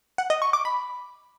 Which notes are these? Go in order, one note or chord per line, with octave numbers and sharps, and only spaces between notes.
F#5
D#5
C#6
D6
B5